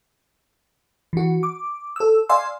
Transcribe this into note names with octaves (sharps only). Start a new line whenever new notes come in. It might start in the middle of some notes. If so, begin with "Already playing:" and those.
E3 F#4
D6
A4 E6
D5 F5 G#5 C6 E6